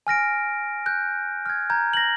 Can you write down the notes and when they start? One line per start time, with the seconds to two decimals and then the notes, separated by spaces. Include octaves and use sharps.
0.07 G#5 F6 A#6 D7
0.86 F#6 G6
1.46 F6 G#6
1.70 A#5 G6 G#6
1.93 A#6 F#7